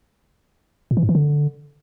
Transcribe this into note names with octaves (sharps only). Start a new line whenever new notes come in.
A#2
E3
G#2
E3
D3